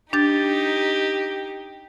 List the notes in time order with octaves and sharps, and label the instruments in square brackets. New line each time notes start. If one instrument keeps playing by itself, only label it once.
[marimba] D4 G6 A6 [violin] D#4 G4